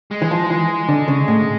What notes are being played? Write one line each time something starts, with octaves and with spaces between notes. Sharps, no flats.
G#3
E3
F3
E3
D3
C#3
A2